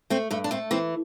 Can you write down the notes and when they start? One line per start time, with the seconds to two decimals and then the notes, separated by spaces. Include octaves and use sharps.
0.10 A3 C4
0.30 G2 A3
0.44 D4
0.51 A3 C4
0.71 E3 C4